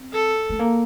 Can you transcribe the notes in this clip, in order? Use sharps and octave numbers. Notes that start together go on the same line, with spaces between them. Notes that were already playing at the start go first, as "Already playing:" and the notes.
Already playing: C4
A4
A3
A#3